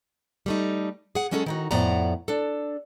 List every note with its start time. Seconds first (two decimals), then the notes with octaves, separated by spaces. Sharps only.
0.46 G3 A3 D#4
1.15 G#4 F#5
1.31 F#3 G#3 C#4 F#4 G#4 A4
1.46 D#3 D#4 F#4
1.71 F2 A2 B3 D5 F#5 A#5
2.28 D4 A4